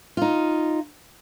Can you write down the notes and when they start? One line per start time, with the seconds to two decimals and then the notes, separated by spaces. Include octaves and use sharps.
0.17 D#4 F4